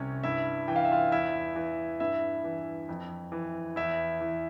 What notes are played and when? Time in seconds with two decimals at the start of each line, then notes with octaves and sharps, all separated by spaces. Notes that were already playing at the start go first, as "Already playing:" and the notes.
Already playing: C2 C3 C#4 C#5
0.24 G2 E4 E5
0.68 E3 G5
0.76 F5
0.85 E5
0.92 F4 F5
1.12 E2 E4 E5
1.56 E3
2.00 G2 E4 E5
2.44 E3
2.89 F2
3.32 E3
3.76 E2 E4 E5
4.21 E3